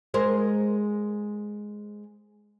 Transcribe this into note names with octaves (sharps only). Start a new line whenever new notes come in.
G#3 A#4 C5